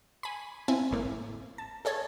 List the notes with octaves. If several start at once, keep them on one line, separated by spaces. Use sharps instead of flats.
G#5 B5
C4 E4 F4 G#5
G#1 A2 A#3
A5
G#4 A4 C#5 G#5 A5